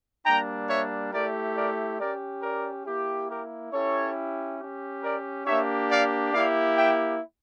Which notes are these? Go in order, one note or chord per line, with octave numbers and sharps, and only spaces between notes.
G3 A#3 D4 G5 A#5
C#5 E5
A3 E4 G4 A#4 D5
A#4 D5
C#4 G4 A#4 D5
A#4 D5
A#3 E4 G4
G4 A#4
C#4 E4 G4 A4 C#5
C#4 G4
A#4 D5
A#3 D4 G4 C#5 E5
D5 F5
A#3 E4 G4 D5 F5
E5 G5